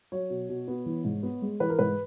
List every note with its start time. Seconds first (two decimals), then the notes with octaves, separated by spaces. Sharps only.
0.12 F#3 C#5
0.30 B2
0.49 B2
0.68 B3
0.86 E3
1.05 G#2
1.23 B3
1.42 G#3
1.60 E3 B4
1.70 A#4
1.79 G#2 B4